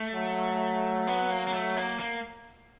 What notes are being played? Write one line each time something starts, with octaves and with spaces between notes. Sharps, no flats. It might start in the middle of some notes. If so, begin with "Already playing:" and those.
Already playing: A3
F#3
B3
A#3
A#3
A3
A#3
A#3